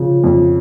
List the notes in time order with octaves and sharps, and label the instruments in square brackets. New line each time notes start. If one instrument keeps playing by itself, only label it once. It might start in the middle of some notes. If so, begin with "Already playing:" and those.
Already playing: [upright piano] C#3 F3
F2